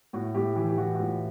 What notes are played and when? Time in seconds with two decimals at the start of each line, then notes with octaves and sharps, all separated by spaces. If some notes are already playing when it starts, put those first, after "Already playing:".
0.13 A2 F#4
0.34 A2 G4
0.56 E3 G4
0.69 G4
0.78 E3 F#4
0.95 F#4
0.99 A2 F4